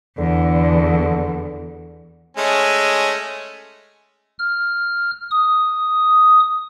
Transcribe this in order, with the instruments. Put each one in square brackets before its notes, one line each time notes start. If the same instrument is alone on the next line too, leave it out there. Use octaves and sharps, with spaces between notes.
[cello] E2 [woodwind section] D3
[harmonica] G#3 A3 C#4
[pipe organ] F6
D#6